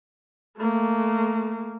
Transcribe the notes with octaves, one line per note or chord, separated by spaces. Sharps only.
A3 A#3